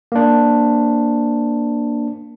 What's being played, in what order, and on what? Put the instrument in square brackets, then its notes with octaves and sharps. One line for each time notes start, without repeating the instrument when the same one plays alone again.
[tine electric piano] A#3 D4